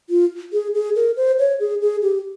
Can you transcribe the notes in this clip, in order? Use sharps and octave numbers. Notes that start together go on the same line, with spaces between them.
F4
G#4
G#4
A#4
C5
C#5
G#4
G#4
G4